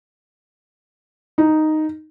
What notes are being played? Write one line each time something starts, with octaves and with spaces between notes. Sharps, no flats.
D#4